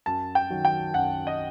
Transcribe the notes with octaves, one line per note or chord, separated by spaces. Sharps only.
F#2 A5
G5
D#3 F#3
G5
F#2 F#5
D#5